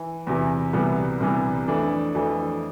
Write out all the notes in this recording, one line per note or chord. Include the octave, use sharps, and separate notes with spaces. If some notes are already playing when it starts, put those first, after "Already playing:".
Already playing: E3
E2 C3 E3
C2 C3 E3 G3 B3
C2 C3 E3 G3 B3
F2 E3 A3 D4
F2 E3 A3 D4